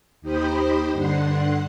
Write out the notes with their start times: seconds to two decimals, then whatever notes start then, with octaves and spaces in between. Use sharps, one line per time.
0.21 D#2 D#4 G4 C5 D#5 B5
0.93 G2 D3 F#5 C6